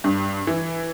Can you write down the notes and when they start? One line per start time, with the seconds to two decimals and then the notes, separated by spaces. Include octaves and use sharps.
0.04 G2
0.47 E3